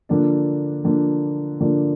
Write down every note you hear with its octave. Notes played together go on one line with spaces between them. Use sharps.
D3 F3 A#3 D4
D3 F3 A#3 D4
D3 F3 A#3 D4